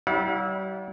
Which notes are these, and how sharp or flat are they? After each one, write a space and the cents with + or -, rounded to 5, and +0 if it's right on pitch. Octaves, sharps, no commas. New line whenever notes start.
G3 -40 E4 -20 F5 +45